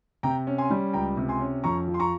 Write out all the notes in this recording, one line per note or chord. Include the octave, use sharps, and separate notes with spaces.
C3 G5 A#5
C#4
G#5 C6
G3
C#2 G5 A#5
C3
G#5 C6
C#4
F2 A#5 C#6
F3
C6
A#5 C#6